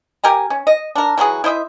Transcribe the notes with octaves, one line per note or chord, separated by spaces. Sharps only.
G4 A#4 G#5 A#5
C#4
D#5
D4 A#4
E3 F#3 F#4 G#4
E4 C5 D#5 E5